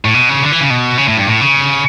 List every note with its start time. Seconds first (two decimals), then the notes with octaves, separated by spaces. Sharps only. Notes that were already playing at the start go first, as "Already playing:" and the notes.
0.05 A2
0.14 B2
0.29 C#3
0.42 D3
0.52 E3
0.61 C#3
0.70 B2
0.98 C#3
1.08 A2
1.17 G2
1.26 A2
1.41 C#3